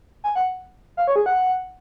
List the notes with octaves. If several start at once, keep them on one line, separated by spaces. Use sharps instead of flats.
G#5
F#5
F5
C#5
G#4
F#5